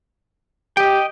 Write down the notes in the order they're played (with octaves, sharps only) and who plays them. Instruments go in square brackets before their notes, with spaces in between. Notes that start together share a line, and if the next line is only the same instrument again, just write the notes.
[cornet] G4 [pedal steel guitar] D#5 G5